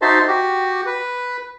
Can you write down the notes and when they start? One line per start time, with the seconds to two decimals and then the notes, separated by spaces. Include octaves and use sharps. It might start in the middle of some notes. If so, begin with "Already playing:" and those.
0.02 D#4 F#4 C5 E5 A5 C6
0.28 F#4 G4
0.86 B4